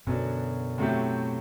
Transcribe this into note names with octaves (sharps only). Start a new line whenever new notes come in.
F#2 B2 D3 F#3 B3
A2 F#3 A3 C4 G4